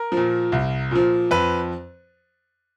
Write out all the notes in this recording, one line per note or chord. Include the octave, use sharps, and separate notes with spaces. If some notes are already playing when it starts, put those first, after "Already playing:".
Already playing: A#4
F3
A#2
C2
A#2 F3
F2 B4